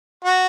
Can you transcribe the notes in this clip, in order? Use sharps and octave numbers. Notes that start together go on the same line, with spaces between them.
F#4